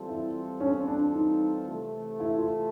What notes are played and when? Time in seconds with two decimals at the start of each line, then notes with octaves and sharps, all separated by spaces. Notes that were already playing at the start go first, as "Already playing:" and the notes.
Already playing: E3 G3 C4 F4 A4
0.09 E4
0.60 C#4
0.87 D4
1.14 D#4
1.67 C3 E3 A3
2.20 E4
2.37 F4